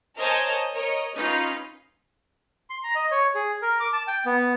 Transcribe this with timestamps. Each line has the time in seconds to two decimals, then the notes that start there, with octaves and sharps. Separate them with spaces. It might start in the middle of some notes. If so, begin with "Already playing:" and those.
0.18 A#4 C5 C#5 D#5 G#5 A5
0.73 A#4 C#5 D#5
1.14 C#4 D#4 F4 B4
2.70 C6
2.84 A#5
2.95 D#5
3.11 C#5
3.35 G#4
3.62 A#4
3.80 D6
3.93 A5
4.08 G5
4.26 B3